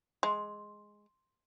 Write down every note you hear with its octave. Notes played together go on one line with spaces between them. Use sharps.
G#3 C6